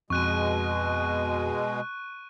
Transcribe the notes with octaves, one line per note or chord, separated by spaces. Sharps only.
F2 B2 G#3 C#6 F#6 D#7